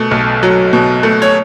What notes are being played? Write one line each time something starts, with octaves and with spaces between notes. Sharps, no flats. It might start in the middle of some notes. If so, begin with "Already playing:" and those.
Already playing: B2 A3
B1
F#3
B2
A3
C#5